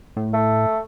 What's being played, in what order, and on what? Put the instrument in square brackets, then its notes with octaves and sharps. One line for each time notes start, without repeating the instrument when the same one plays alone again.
[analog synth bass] A2
[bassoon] A3